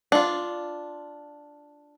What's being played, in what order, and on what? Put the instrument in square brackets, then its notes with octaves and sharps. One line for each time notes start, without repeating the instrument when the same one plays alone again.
[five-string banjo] D4 F4